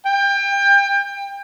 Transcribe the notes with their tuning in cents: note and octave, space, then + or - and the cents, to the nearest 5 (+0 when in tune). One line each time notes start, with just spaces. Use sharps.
G5 +30